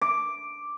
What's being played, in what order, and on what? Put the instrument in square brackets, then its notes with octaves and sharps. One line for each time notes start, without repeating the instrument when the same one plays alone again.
[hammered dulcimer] D6